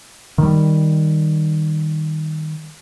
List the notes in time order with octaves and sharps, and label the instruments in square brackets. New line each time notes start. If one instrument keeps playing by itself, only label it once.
[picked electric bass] D#3 G3